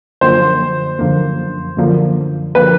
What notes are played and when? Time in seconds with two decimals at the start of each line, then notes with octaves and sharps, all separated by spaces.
0.21 F#2 D3 F3 A#3 C5
0.99 F#2 D3 F3 A#3
1.77 F#2 D3 F3 A#3
2.55 D3 F3 A#3 B4